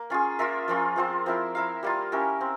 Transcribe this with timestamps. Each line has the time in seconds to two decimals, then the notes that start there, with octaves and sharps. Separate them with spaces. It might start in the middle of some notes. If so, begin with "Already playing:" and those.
Already playing: A#3
0.10 C#4 F4 G#4
0.39 A#3 F4 A#4 E5
0.68 F3 A#3 C#4 F4
0.96 F3 C4 F4 C5
1.26 F3 C4 E4 A#4
1.55 E4 A#4 F5
1.83 G3 A#3 F4
2.12 C#4 E4 G4 A#4
2.41 C4